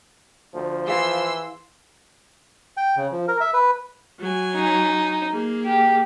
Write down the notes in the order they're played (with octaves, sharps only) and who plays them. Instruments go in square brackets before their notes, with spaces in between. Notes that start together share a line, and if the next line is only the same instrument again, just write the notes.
[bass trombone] D2 [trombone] F3
[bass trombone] E3 [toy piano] G#4 F5 [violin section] C6 E6
[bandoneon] G5
C#3
F3
A#4
E5
B4
[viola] F#3 G#5
[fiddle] D#4
[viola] A#3 G#4
[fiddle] G4